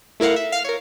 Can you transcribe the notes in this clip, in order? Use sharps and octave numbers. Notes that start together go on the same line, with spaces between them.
A3 E4 A#4 F5 F#5
E5
F5 F6
A#4 C#5